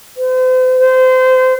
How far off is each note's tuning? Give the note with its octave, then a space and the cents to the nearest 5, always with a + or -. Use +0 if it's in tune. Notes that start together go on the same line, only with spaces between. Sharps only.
C5 -40
C5 -25